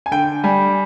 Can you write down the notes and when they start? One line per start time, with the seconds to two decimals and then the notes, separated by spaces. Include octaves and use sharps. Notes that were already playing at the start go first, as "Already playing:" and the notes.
0.06 G#5
0.11 D3 G5
0.44 G3 G#5